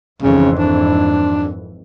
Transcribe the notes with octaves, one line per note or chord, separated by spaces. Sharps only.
G#1 F2 C#3 E3
D4